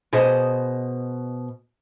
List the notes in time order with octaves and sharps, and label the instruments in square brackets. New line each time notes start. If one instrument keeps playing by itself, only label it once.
[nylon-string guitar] B2 G#4 C5 D#5